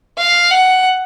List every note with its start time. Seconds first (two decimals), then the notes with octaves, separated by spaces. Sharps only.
0.18 F5
0.50 F#5